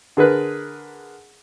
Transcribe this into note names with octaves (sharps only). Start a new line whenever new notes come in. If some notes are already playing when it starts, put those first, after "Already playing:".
D3 G#4 A#4 B4